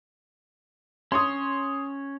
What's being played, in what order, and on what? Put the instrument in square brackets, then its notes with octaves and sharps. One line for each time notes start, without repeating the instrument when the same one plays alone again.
[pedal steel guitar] C#4 C#5 [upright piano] C6 D#6